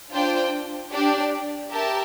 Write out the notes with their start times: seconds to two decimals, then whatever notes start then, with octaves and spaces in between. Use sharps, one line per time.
0.12 D4 F4 C5 G5
0.92 D4 G4 D5
1.71 G4 A#4 E5 A5